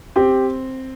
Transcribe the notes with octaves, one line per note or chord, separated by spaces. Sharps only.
C4 G4